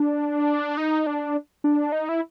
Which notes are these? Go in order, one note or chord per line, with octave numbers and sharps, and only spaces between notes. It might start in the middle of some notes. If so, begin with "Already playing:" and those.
Already playing: D4
D#4
D4
D4
D#4
E4